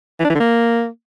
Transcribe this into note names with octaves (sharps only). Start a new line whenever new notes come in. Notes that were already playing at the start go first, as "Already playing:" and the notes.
E3
D4
E3
D3
A#3